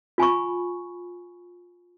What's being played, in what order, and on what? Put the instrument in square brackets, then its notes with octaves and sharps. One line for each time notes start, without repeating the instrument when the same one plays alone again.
[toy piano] F4 G#5 B5 C#6